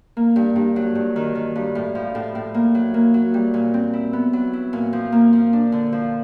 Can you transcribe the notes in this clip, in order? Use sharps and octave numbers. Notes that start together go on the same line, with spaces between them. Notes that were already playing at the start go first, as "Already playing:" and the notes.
A#3
G2
G2
F#3
G2
D#3
D#3
G2
A2
F3
A2
A2
A#3
F#3
A#3
F#3
G3
A#2
C4
E4
B3
F#3
E4
A#2
F3
A#3
F3
D4
D3
F3